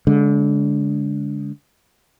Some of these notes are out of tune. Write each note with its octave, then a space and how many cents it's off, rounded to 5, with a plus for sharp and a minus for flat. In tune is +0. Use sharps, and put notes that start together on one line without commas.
D3 -35 G#3 +0